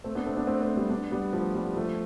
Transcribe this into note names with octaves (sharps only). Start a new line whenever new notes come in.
A3 C4
B3 D4
A3 C4
B3 D4
A3 C4
A3 C4
G3 B3
B3 D4
G3 B3
F3 A3
G3 B3
F3 A3